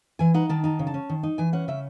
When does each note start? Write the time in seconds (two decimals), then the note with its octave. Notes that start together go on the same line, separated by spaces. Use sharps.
0.19 E3 G#5
0.34 D#4 F#5
0.49 D#3 A5
0.64 D#4 A5
0.79 C#3
0.87 A5
0.94 C#4
1.09 D#3
1.23 D#4
1.38 E3 G#5
1.53 C#4 F#5
1.68 C#3 E5